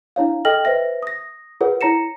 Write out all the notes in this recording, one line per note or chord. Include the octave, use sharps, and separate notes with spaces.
D4 E4 C#5 F5
A4 D#5 G5 F6 A#6 F#7
B4 C5 E5 A#6
D#6 A#6
F4 G#4 A#4 B4 C#5 F#5
E4 C#5 A#5 A#6 C#7 E7